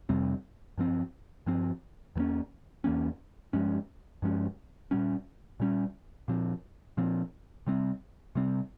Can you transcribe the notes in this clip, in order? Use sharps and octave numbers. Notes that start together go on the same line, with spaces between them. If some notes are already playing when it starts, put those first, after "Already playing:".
F2 C3 G3 C4
G2 F3 C4
G2 F3 C4
E2 E3 A#3 C#4
E2 E3 A#3 C#4
G2 F3 G#3 C#4
G2 F3 G#3 C#4
A#2 G3 C#4
A#2 G3 C#4
A#2 F3 C4
A#2 F3 C4
C3 G3 C4
C3 G3 C4